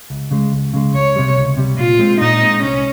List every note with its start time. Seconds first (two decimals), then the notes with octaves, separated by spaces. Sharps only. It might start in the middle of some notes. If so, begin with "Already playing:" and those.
0.10 C#2
0.31 C#3 G#3
0.52 C#2
0.74 C#3 G#3
0.94 C#2 C#5
1.16 C3 G3
1.37 C#2
1.57 C3 G3
1.78 A#2 F4
1.99 G#3 C4
2.20 A#2 D#4
2.41 G#3 C4
2.62 C2 C#4